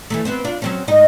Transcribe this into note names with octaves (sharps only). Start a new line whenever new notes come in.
E3 G3 A3
B3 C4 C5
D4 F4
F#3 C4 C#4
G#2 D#4 D#5